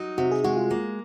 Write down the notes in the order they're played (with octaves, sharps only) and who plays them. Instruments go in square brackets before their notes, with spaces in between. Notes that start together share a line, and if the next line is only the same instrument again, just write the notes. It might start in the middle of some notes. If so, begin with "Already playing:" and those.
Already playing: [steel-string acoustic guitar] F#3 D#4
[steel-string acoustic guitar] C3 [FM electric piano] F#4
[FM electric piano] G#4
[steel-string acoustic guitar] G#3 [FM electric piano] F#4
[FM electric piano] F4
[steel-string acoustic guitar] A#3